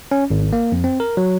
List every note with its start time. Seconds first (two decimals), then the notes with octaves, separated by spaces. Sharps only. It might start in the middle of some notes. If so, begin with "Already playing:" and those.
0.11 C#4
0.30 G#1
0.53 A#3
0.72 F2
0.84 C4
1.00 A#4
1.17 F#3